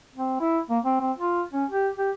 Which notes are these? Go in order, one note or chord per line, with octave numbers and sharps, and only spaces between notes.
C4
E4
A#3
C4
C4
F4
C#4
G4
G4